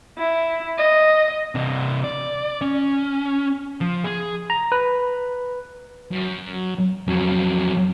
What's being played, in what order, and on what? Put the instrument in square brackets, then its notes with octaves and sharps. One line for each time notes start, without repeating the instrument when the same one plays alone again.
[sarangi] E4
D#5
[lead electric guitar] C3 D4
D5
C#4
F3
G#4
[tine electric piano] A#5
B4
[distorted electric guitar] F#2
F2 F#3